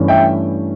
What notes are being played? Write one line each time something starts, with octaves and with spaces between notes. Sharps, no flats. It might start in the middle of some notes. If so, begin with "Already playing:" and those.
Already playing: G2 E3 A3 C#4
E5 G5